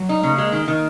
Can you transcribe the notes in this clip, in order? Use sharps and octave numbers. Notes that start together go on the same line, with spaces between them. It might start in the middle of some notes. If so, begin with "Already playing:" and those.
Already playing: F#3
D#4
C#3 A#3
G#3
D#3
D#3